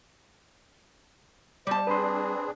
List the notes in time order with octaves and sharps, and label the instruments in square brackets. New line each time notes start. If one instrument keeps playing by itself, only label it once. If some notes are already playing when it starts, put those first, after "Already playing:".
[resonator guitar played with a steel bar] G3 A5 [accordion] C5 D#5
[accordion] C4 D4 G#4 [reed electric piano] B4 B5 C6